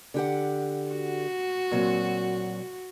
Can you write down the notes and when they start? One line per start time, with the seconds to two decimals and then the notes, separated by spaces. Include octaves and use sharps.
0.14 D3 G4 F#5
0.90 F#4
1.71 A#2 F#3 C4